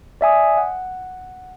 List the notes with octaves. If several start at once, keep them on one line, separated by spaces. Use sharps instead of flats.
D5 E5 G#5 D#6
F#5